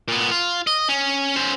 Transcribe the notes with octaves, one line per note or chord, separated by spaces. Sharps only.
A#2 B3
F4
D#5
C#4
C#4 C5